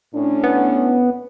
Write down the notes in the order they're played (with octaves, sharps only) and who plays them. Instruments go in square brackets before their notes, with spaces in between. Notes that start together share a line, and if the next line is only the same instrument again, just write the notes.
[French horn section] A2 C#4 D4
[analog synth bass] B3